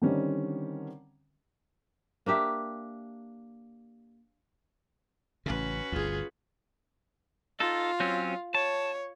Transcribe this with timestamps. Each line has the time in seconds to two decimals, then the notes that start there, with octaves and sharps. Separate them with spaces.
0.02 D3 D#3 G3 C4 C#4
2.26 A#3 D4 G4 E5
5.46 A1 C#3 C#4 F#4 B4
5.92 G1 D2 F4 G#4
7.60 D#4 F4 A4
8.00 F#3 C4 C#4
8.55 C#5 A5